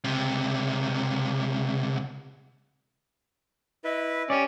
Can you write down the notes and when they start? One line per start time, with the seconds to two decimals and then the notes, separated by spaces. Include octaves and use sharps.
0.04 C#2 C3
3.85 E4 B4 D#5
4.30 C#4 G4 D5